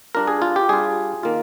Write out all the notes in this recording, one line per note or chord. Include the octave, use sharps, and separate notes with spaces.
G3 D4 F4 A#4
G#4
F4
G4
G3 D4 F4 G#4
D#3 A#3 F4